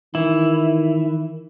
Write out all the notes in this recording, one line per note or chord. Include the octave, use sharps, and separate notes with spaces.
D#3 E3 E4